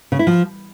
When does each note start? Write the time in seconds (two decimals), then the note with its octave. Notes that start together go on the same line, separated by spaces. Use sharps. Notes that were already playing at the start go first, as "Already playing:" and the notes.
0.12 C#3
0.19 E4
0.27 F3